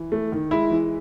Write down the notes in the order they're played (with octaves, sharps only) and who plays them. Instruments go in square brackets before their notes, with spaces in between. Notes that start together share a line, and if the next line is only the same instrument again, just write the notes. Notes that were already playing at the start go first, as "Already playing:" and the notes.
Already playing: [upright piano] E3
A3
D#3
G#3 E4
E3